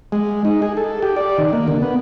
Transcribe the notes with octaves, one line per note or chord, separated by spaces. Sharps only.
G#3
D#4
G#4
A4
G4
D5
D#3
A#3
D3
B3